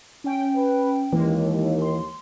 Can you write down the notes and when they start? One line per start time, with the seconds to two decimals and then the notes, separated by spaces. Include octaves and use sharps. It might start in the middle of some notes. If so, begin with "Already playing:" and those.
0.24 C#4 G5
0.56 B4
1.13 D#2 E3 G#3 A#3
1.82 C6